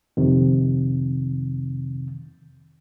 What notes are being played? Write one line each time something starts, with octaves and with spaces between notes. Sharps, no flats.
F2 C3 D#3